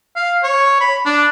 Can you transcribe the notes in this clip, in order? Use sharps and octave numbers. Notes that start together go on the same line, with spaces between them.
F5
C#5
B5
D4